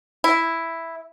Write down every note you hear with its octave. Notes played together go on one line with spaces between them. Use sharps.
E4